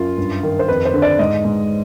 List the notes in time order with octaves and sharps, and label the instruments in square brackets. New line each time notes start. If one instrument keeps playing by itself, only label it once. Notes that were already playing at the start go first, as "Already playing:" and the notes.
Already playing: [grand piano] F#2 F4
G2
D#3
C5
F2 B4
C5
D3
D5
G#2 D#5
G#2